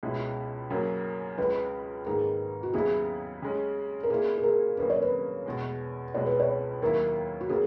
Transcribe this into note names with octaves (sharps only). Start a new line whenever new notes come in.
C#2 B2 G#3 C#4 E4
F#2 C#3 F#3 A#3 C#4
C#2 C#3 G#3 B4
G#2 D#3 A#3 D#4 G#4
F#4
D#2 C#3 F#3 B3 E4 G#4
C#3 G#3 C#4
A#4
A#2 A#3 E4 G#4
G#4
A#4
C#3 F#3 A#3 C#4 B4
C#5
B4
E2 B2 G#3
C#2 B2 G#3 C#5
B4
C#5
D#2 D#3 F#3 A#3 E4 A#4
F#4
C#3 F#3 A#3 G#4